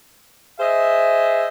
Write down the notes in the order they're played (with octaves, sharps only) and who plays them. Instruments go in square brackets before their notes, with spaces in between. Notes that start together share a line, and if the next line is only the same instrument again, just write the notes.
[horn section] G#4 C5 D#5 E5